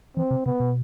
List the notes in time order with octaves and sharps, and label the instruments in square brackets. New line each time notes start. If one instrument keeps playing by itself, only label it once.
[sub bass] E3 [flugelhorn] C4
[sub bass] C3
[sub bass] C3 [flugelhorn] B3
[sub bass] B2